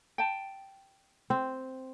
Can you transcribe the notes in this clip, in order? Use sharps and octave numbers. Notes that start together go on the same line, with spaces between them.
G5 A5
C4